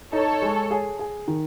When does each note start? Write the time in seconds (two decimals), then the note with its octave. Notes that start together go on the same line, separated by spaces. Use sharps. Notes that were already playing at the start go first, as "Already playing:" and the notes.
0.13 D#4 A4 C#5
0.42 G#3
0.71 G#4
0.99 G#4
1.28 D#3